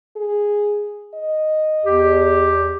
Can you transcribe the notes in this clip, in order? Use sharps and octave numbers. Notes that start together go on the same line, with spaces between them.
G#4
D#5
E2 G4